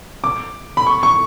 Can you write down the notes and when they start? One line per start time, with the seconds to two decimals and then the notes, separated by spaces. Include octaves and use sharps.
0.24 D6
0.77 B5
0.87 C#6
1.03 C#6